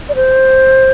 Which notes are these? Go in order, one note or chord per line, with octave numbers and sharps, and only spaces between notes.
D5
C5